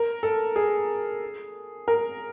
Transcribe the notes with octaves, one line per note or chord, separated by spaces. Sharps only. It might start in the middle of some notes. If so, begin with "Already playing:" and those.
Already playing: A#4
A4
G#4
A#4